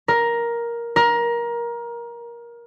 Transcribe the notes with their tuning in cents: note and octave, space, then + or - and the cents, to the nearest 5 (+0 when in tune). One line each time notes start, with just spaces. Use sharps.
A#4 +10
A#4 +20